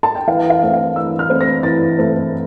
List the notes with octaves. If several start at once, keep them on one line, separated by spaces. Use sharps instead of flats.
A5
G5
E3 F5
F5
A3 C4
F5
E3 E6
F6
A3 C4
A#6
E3 A6
A3 C4